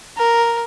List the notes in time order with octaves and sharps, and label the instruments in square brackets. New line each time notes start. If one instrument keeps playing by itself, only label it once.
[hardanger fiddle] A#4